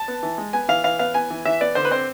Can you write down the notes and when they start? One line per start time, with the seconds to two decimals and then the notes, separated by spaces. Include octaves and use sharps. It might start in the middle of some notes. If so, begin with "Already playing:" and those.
Already playing: A5
0.08 B3
0.23 E3
0.38 G#3
0.53 B3 G#5
0.68 E3 F5
0.84 E3 F5
0.99 B3 F5
1.14 B3 G#5
1.30 E3
1.45 E3 E5
1.61 B3 D5
1.75 D3 C5
1.85 B4
1.91 C4 C5